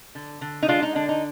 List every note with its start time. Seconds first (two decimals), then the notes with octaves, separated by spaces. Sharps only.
0.15 D3
0.41 D3
0.62 D#4
0.68 G#3 D4 F4
0.82 D#4
0.95 D3 D4
1.09 D#4